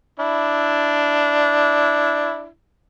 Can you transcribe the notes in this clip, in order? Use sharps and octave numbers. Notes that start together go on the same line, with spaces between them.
D4 E4